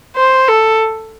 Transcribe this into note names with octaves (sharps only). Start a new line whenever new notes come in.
C5
A4